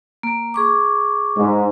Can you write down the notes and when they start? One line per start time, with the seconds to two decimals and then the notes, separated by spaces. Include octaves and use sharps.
0.23 A#3
0.54 G#4 C#6 D6
1.37 G#2